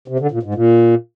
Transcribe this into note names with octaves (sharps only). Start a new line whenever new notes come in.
C3
D3
A#2
G#2
A#2